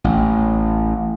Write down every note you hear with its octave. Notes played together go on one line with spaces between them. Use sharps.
A1